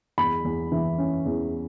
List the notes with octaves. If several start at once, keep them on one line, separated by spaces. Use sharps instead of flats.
E2 B5
E2
E3
C#4
E2